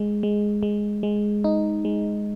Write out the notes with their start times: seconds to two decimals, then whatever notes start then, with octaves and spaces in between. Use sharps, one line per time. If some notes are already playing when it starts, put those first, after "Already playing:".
Already playing: G#3
0.23 G#3
0.63 G#3
1.03 G#3
1.44 D#4
1.85 G#3